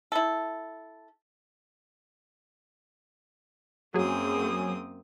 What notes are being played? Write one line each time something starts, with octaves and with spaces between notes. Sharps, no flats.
E4 A4
F#2 F#3 A#3 C4 G#4 D#6